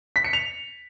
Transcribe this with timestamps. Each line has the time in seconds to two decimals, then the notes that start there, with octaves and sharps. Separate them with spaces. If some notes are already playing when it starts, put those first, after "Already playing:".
0.16 B6
0.24 C#7
0.33 F7